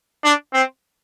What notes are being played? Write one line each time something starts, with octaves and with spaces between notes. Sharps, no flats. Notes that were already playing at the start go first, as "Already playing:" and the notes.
D4
C4